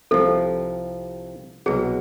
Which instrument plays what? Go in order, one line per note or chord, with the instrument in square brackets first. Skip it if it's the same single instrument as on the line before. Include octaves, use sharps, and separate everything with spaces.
[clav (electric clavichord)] C2 C3 F3 [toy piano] A4
[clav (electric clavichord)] C2 B2 F#3 [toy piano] G#4